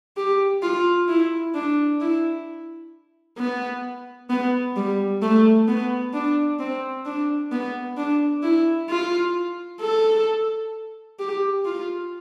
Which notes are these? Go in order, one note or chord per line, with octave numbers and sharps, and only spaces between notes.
G4
F4
E4
D4
E4
B3
B3
G3
A3
B3
D4
C4
D4
B3
D4
E4
F4
A4
G4
F4